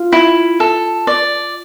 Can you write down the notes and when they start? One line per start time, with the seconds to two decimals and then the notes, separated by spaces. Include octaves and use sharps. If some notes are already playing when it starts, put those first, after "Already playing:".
Already playing: F4
0.12 E4
0.60 A4
1.07 D5